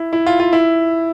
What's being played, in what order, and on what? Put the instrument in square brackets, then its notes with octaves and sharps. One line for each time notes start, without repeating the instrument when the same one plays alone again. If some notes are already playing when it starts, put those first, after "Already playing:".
Already playing: [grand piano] E4
E4
F4
F4
E4